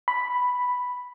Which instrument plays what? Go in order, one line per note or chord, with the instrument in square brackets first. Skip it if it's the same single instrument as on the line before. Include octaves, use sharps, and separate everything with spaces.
[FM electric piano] B5